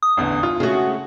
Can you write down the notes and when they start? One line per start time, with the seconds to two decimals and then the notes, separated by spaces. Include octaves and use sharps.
0.03 D#6
0.17 A1 E2 D3
0.43 F4
0.60 C#3 G#3 A3 F#4 G#4